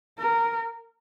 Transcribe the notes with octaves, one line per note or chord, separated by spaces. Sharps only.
A#4